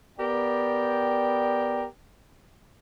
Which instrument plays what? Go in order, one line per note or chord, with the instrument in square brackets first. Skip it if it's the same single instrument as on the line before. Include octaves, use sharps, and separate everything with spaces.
[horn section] B3 G4 A#4 D5 G5